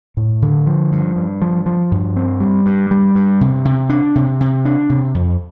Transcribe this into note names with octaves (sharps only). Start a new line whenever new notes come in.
A2
D3
F3
G2
G2
F3
F3
G2
C4
G3
G2
G3
G2
C3
C3
D4
C3
C3
D4
C3
F2